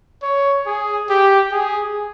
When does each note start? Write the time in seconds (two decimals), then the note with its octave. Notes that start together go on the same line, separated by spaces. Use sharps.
0.22 C#5
0.67 G#4
1.09 G4
1.52 G#4